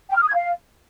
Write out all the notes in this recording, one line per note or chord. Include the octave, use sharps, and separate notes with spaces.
G5
F6
D#6
G#6
F5